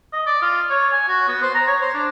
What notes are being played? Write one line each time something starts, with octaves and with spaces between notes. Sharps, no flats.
D#5
D5
F4
C#5
G#5
F#4
B3
C5
A#5
C#5
C5
D4